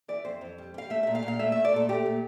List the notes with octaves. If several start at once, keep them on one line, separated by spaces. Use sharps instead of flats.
E3 D5
F2 C5
F2
G3
G3 F5
A3 E5
E5
A#2
F5
A#2
F5
A3 E5
E5
A3
D5
A#2 A4
A3 G4
A#2